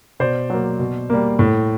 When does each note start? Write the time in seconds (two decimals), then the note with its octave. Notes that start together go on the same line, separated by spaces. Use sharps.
0.20 B2 C5 D5
0.50 F#3 A#3
0.79 B2
1.10 G3 A#3
1.39 A2